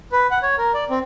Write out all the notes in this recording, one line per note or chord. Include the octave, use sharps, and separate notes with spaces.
B4
F#5
C#5
A#4
D5
C4